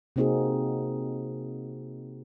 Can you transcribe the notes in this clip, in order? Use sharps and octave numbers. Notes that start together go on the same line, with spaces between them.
C3 A#3 C4 D#4 F#4 G#4